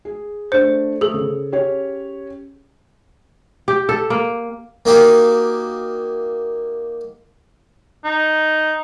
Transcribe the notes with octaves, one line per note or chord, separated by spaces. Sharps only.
G#4
A3 D4 C5 C#7
A3 G#4 A4
C#3
C#4 G4 C#5
G4
A4
A#3
A#3 D#4 F#4 G4 F5
D#4